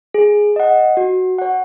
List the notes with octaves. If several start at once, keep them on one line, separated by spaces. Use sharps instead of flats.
G#4
D#5 F#5
F#4
C#5 F#5